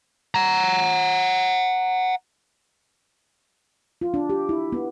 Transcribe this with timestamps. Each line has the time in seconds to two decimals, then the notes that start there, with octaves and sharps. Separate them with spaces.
0.35 F#5 A#5
4.01 F4
4.14 D4
4.30 G4
4.49 E4
4.72 B3